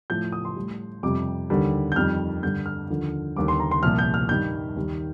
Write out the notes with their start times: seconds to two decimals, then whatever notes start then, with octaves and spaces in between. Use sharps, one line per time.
0.10 A2 F3 G6
0.32 D#6
0.45 C6
0.56 A2 G3
1.03 F2 C3 G3 D6
1.50 D#2 D3 G3
1.92 G6
1.96 F2 D#3 G3 F6
2.43 G2 D3 G3 G6
2.66 F6
2.90 D#2 D3 F3
3.36 D#2 D3 G3 D6
3.48 C6
3.60 A#5
3.71 C6
3.83 C2 A#2 F3 F6
3.98 G6
4.14 F6
4.29 G2 D#3 G3 G6
4.76 D#2 D#3 G3